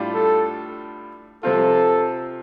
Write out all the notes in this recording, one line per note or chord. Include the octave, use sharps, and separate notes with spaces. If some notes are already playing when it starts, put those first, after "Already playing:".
Already playing: A2 G3 D4 F4
A4
C3 F3 C4 F4 A4